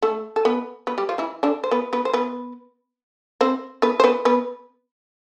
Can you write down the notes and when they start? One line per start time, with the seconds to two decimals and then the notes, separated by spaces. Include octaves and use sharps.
0.02 A3 A4
0.36 A4
0.45 B3 B4
0.87 B3 B4
0.98 G3 G4
1.09 F3 F4
1.18 E3 E4
1.43 D3 D4
1.64 C5
1.71 B3 B4
1.93 B3 B4
2.05 C5
2.13 B3 B4
3.41 C4 C5
3.82 B3 B4
4.00 C5
4.04 B3 B4
4.25 B3 B4